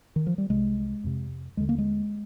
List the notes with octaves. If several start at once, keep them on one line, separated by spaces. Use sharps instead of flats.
D#3
F3
G3
C2 C3 G#3
F2 C3
D#2 D3 G#3
A#3
G#3